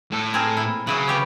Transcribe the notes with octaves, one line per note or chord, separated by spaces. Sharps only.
A2 A4
C4 G#4 A#4
E4
C#3 F#3 E4 F#5
B3 G4 C#5